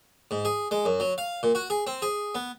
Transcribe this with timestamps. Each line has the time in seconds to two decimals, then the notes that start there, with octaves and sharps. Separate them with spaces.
0.31 G#2
0.45 G#4
0.71 G#3
0.85 F#2
1.00 F#3
1.18 F5
1.43 A#2
1.55 F#4
1.70 G#4
1.87 C4
2.02 G#4
2.35 B3